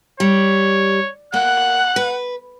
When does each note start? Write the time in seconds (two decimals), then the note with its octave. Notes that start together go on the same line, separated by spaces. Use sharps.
0.20 G3 C#5
1.34 A#3 F#5 F#6
1.96 B4